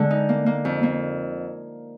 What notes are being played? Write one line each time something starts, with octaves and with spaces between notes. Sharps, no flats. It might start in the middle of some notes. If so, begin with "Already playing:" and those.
Already playing: D3 G#3
D#4
A#3
A#3
F2
A#3